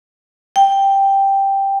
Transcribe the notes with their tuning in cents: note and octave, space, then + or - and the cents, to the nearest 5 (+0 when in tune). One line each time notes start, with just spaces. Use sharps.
G5 +0